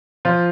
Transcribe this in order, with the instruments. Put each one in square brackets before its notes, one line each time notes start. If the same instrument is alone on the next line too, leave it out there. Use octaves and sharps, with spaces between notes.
[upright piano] F3 F4